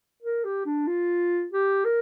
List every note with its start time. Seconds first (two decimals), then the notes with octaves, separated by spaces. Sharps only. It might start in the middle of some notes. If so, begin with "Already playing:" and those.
0.23 A#4
0.44 G4
0.66 D4
0.87 F4
1.52 G4
1.85 A#4